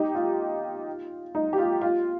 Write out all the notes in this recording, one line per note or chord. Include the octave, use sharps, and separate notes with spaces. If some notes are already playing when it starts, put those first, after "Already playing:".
Already playing: D#4 G4
F4
D#4
G4
F4
F4